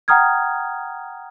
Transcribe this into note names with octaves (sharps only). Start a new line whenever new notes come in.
F#5 G5 A#5 D#6 F6 G#6